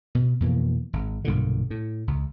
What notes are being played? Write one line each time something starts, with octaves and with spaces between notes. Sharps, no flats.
B2
F2 B2 E3 A#3
G#1
B1 G2 A#2 D3
A2
C#2